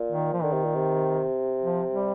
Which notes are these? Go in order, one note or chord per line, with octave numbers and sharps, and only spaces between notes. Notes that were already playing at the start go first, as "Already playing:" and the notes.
Already playing: A#2
D#3
F3
D3 D#3
C3
A#2
C3
F3
G3